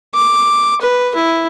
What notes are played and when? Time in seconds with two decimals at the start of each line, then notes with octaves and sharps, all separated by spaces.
0.14 D6
0.81 B4
1.15 E4